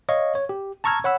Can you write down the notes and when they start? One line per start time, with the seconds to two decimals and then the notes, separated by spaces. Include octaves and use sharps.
0.09 C#5 D#5 F5 C#6
0.35 C#5
0.49 G4
0.84 A5 A#5 C#6 E6 F6 G#6
1.04 C#5 F#5 B5 E6